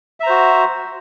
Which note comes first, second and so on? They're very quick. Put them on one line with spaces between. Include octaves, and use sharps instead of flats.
E5 A#5 C5 F#4